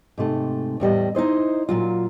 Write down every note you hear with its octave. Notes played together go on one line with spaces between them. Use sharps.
G#2 C3 A3
E2 A2 G3 D#5
D#4 E4 C5 D#5
A#2 F#3 F4